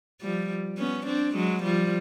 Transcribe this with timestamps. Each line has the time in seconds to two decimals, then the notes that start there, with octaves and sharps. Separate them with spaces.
0.21 F3 G3
0.78 B3 C#4
1.06 C4 D4
1.35 F#3 G#3
1.63 F3 G3